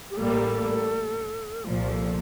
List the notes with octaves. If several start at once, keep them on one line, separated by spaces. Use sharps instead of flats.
G4
A1 A2 G3 A#3 A4
C2 A#2 F3 F4
A4